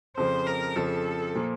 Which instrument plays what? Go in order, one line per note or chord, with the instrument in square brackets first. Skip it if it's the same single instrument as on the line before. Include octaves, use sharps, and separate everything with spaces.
[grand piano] F2 C#3 F3 [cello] C5
[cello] A#4
[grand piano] F2 C#3 F3 [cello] A4
[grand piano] A#2 F3 A#3